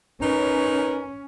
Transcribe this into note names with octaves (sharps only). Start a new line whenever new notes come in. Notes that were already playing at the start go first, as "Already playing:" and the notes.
C#4 D#4 A#4 B4